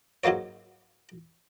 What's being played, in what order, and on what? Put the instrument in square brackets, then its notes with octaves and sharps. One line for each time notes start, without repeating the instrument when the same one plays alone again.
[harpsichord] G#2 F#3 G#3 A#3 C#5